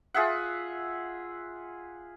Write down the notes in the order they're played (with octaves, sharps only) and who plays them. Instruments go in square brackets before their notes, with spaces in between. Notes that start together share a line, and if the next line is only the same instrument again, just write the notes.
[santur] F4 G#4 E5 F#5